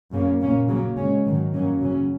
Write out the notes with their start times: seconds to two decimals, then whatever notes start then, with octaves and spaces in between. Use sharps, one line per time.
0.12 F#2 C#3 A#3 C#4
0.40 A#2 A#3 C#4
0.68 C#3 F#3 A#3 C#4
0.97 C#3 G#3 C#4
1.25 G#2 D#3 F#3
1.53 F#2 F#3 A#3 C#4
1.81 C#3 F#3 C#4